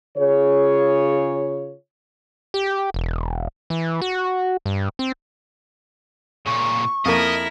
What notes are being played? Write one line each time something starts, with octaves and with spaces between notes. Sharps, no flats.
C#3 F4 G#4 C#5
G4
E1
E3
F#4
G2
C4
A#2 C#3 C#6
F2 A#3 E4 A#4 D#5